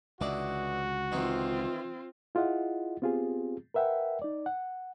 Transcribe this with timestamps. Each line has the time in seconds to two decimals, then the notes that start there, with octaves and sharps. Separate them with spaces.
0.21 C#2 D3 E3 F#4 D5 D#5
1.12 D#3 E3 C4 D#4 F4
2.35 E4 F4 G#4 D#5 F#5
3.02 B3 C4 F4 G4 G#4
3.74 A#4 B4 E5 F#5 G5
4.22 D#4 D5
4.46 F#5